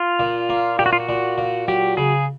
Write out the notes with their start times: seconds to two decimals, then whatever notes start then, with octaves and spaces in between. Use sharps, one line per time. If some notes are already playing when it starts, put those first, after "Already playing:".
Already playing: F4
0.19 A#2
0.49 A#3
0.79 A#2 G4
0.86 F#4
0.93 F4
1.00 F#4
1.09 A#2
1.38 A#2
1.68 F#3 G4
1.97 C#3 G#4